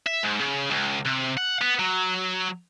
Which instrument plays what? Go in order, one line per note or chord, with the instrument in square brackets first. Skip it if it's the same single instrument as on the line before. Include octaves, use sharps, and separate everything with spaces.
[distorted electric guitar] E5
G#2
C#3
C#2
C3
F#5
B3
F#3